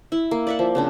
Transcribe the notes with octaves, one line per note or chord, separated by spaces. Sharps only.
E4
A#3
D5 E5 F#5
F3
C#3 C4 D4